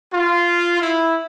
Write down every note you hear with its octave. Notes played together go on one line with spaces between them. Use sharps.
F4
E4